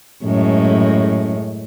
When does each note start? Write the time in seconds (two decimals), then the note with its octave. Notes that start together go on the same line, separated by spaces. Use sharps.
0.24 F#2 A2 G#3